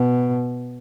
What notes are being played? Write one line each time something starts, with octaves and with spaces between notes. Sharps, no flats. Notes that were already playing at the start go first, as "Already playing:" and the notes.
Already playing: B2